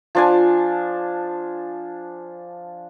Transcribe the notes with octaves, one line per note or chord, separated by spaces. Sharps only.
F3 D4 G#5